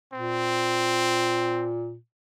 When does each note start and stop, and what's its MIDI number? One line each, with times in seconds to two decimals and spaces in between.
0.13 1.97 46
0.13 1.69 60